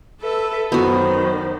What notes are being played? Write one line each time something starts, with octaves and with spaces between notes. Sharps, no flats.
A4 B4 E5
F#2 D#3 B3 F#4 C5